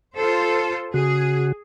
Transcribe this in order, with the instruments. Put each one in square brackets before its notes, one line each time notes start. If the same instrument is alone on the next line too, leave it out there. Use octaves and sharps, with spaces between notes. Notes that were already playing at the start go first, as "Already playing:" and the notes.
[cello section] F4 A4 C5
[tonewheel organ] C#3 F#4 [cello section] G#4